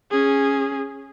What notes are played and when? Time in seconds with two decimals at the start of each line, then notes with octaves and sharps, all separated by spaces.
0.11 C#4 G#4